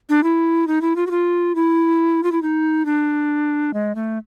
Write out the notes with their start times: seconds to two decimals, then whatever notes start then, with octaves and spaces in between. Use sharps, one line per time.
0.09 D4
0.23 E4
0.67 D#4
0.81 E4
0.96 F4
1.07 F#4
1.11 F4
1.55 E4
2.23 F4
2.32 E4
2.42 D#4
2.86 D4
3.74 G#3
3.95 A3